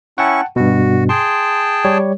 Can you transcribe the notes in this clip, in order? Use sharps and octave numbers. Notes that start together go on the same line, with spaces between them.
C#4 E4 F#5 G5 A5 C#6
G2 B2 F#4
G#4 G5 A5 C6
G3 G4 C#5